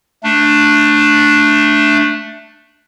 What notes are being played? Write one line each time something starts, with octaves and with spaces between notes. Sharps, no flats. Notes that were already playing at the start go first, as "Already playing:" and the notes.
A3 D4